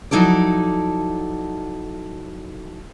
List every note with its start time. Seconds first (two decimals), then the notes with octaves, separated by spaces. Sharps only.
0.11 F3 F#3 D#4 E4 A4 D5